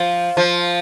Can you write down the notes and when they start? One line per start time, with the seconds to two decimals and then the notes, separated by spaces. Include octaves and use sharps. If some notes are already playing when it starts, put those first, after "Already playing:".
Already playing: F3
0.37 F3